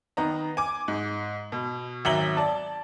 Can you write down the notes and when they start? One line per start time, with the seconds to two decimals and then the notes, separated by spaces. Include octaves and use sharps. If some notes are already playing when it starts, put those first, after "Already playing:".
0.17 D#3 B3 D#5 A#5
0.57 G#5 D6
0.88 G#2
1.52 B2
2.05 G#1 F#3 E5 A#5 F#7 G7
2.37 D5 A5